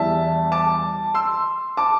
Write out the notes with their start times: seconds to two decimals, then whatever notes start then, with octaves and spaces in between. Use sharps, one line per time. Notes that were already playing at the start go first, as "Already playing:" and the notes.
Already playing: E2 E3 G3 E5 A5
0.52 A5 D6
1.14 C6 E6
1.77 A5 D6